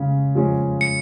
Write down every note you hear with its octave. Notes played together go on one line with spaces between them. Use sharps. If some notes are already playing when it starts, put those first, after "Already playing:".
Already playing: C#3 G#3 C#4
F3 G#3 C#4
C#7